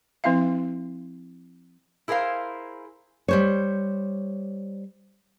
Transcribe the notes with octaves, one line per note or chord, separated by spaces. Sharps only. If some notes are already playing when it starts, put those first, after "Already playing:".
F3 C4 E4 E5 F5
E4 G#4 A#4 C5 F5
G3 C5 C#5